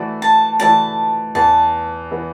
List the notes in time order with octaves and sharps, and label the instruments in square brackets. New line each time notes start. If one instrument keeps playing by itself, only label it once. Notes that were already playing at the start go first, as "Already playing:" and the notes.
Already playing: [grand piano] E3 A3 F#4 D5
[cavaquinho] A5
[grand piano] E3 A3 F#4 D5 [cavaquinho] A5
[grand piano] E2 E3 B3 [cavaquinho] A5
[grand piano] E3 B3